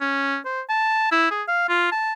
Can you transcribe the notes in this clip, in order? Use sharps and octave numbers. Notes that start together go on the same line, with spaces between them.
C#4
C5
A5
E4
G#4
F5
F4
A5